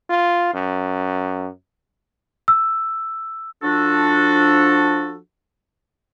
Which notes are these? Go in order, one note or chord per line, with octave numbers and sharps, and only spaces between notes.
F4
F#2
E6
F3 D4 F#4 A4